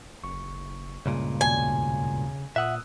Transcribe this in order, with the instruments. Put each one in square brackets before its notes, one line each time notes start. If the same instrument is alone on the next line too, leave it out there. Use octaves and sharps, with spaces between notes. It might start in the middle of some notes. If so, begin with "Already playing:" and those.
[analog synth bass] F#1 [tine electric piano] C#6
[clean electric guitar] C#2 G2 A#2 [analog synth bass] C#3
[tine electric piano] D#2 B2 [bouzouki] G#5
[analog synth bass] A#2 [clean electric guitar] E5 F#5 [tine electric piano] D#6 E6 F#6